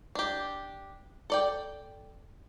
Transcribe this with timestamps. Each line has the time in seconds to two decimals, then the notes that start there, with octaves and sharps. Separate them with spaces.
0.15 D4 G4
1.30 A4 D5 G5